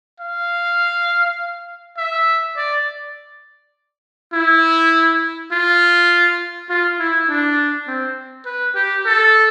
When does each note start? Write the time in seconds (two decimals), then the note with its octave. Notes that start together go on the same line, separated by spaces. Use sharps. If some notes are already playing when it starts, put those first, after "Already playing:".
0.20 F5
1.98 E5
2.57 D5
4.33 E4
5.52 F4
6.70 F4
7.00 E4
7.29 D4
7.88 C4
8.46 B4
8.75 G4
9.06 A4